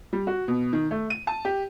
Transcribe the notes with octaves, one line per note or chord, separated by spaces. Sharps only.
G3
F#4
B2
D#3
A3
D#7
A5
G4